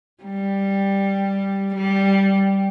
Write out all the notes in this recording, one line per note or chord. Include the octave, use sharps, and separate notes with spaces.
G3
G3